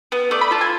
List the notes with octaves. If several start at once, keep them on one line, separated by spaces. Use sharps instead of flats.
B3
A3 D5
B5
F4 A5
G#5